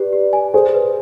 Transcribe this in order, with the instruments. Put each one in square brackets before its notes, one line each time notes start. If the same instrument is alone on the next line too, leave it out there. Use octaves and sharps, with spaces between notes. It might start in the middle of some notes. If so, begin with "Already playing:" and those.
Already playing: [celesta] G4 [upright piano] B4 D5
[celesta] G4
G#5
[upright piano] G#4 C5 [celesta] G#5
[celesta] B4